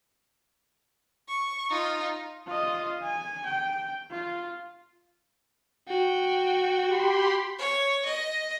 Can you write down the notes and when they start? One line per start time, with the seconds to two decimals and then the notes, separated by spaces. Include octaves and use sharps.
1.28 C#6
1.71 D#4 F4
2.47 F4 D#5
3.03 G#5
3.46 G5
4.10 F4
5.88 F#4 G5
6.86 G4 B5 C6
7.58 C#5
8.05 D#5